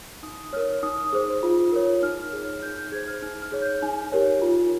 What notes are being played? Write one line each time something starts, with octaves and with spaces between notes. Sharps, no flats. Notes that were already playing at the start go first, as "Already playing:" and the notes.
D#4 D#6
A#4 C#5 F6
D#4 D#6
G#4 C5
F4
A#4 C#5
D#4 F6
G#4 C#5
D#4 G6
G6
G#4 C5 G#6
F6
D#4 F6
F6
G#4 C#5
G6
D#4 G#5
G4 A#4 C#5
F4